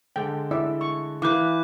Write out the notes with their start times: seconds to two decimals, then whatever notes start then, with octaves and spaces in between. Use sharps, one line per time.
0.16 D3 G#3 A4 G5
0.51 E4 D5 E5
0.81 C#6
1.22 E3 B4 F5 D6 F#6 G6